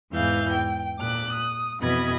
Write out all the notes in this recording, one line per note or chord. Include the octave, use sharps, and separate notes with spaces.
E2 G#2 E3 F5 G6
G5
A#2 D6 F#6
D#6
F2 B2 E3 D#5 B5 G#6